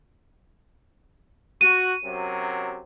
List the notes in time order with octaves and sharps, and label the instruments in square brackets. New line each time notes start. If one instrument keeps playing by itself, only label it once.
[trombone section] F#4 [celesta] D#7
[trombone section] F#2 C3 F#3